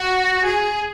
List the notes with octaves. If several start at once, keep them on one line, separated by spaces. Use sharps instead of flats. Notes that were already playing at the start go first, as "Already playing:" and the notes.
Already playing: F#4
G#4